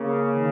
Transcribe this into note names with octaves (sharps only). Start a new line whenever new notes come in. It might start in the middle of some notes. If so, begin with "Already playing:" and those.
Already playing: C#3 A#3
D#3